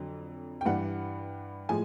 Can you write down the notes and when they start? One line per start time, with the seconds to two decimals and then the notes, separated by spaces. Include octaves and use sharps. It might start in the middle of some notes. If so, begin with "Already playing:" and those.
Already playing: F2 D3 F#3
0.61 G5
0.65 G2 E3 G3 F#5
1.69 A2 F3 G#3 G#5